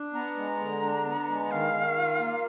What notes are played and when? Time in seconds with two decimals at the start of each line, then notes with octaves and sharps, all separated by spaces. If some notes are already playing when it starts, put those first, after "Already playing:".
Already playing: D4
0.13 B3 A#5
0.37 G#3
0.59 D3
0.82 D4
1.05 B3
1.28 G#3
1.50 D#3 F5
1.73 D#3
1.96 F4
2.19 A#3